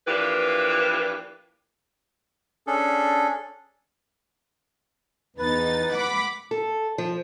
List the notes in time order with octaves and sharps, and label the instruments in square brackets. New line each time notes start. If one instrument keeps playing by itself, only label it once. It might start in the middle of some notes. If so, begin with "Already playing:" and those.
[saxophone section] E3 F3 A#3 D4 G4 B4
[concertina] C#4 D4 G#4 A4
[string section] E2 D#4 A6 [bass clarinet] B4
[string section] F#5 B5 D6
[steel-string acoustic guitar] A4
F3